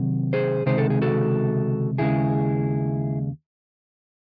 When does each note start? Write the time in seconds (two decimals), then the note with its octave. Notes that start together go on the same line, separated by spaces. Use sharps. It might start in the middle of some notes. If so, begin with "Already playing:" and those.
Already playing: C3 D#3 F#3 C4
0.33 G#4 C5
0.66 C#2 C3 D#3 G#3 C5
0.78 A4
0.90 G#4
1.02 F#4 A4
1.98 D#2 C#3 G#3 E4 G#4